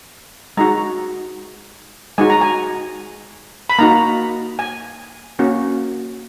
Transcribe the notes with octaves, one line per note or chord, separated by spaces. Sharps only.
G#3 D#4 F#4 A#5
G#3 D#4 F#4 G#5
A#5
G#5
B5
A#3 D#4 F#4 A#5
G#5
A#3 C#4 F#4